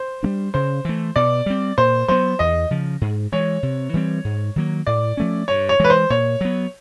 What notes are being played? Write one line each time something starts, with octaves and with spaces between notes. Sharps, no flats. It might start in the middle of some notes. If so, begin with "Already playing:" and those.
Already playing: C5
G3 A#3 D4
C#3 C5
E3 A3
B2 D5
G3 C4
A#2 C5
F#3 B3 C5
E2 D#5
C#3 F3
G#2
E3 G#3 C#5
C3
E3 G3 C4
G#2
D#3 F#3 A#3
A2 D5
F3 A3 C#4
G2 C#5
C#5
E3 G#3 B4
C5
A#2 C#5
F#3 B3